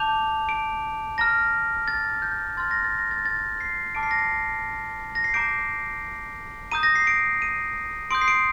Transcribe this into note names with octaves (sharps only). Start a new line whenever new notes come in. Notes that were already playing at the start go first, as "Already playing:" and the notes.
Already playing: A5 D6 G6 F7
D7
A#5 F6 A#6
A6
G6
C6 F6 A6
A#6
A6
A#6
A6
A6
C7
A5 D6 F6 D7
C7
A#6
C7
A#6
C7
A#5 D6 G6 D7
A#5 D#6 G6 D#7
A#6
C7
D7
D#7
C6 D#6 G6 D7
C7
D7